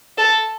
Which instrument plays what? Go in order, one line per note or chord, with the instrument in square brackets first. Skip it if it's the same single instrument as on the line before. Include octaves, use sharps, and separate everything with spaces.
[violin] A4